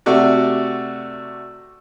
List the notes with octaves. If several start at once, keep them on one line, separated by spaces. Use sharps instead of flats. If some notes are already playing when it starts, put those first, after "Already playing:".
C3 A3 F#4 D5